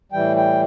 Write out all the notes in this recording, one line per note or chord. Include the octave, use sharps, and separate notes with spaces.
A2 E3 G3 G5
G5